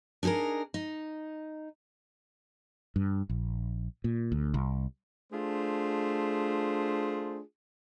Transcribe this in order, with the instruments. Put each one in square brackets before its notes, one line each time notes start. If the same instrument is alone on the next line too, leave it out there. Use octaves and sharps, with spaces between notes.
[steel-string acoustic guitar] D4 D#4 G4 G#4 A#4
D#4
[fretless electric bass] G2
A#1
A#2
D2
C2
[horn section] A3 D4 F4 G#4 C5